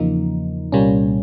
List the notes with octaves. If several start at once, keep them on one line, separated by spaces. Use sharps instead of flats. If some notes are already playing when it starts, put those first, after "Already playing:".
Already playing: E2 C#3 F3 A#3 D#4
C2 A#2 G3 A#3 C#4